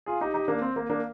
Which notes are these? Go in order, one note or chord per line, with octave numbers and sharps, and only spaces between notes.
F4 G#4
D#4 G4
D#4 G4
A#3 D4
C4
A#3
A#3 D4